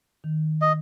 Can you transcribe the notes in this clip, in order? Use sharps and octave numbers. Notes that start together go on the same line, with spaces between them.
D#3
D#5